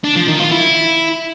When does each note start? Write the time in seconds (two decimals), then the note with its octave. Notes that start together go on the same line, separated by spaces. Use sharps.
0.04 D4
0.16 F3
0.28 D#3
0.40 F4
0.52 E4